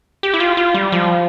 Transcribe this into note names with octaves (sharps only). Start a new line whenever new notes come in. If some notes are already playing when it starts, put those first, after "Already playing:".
G4
E4
F4
F4
G3
F3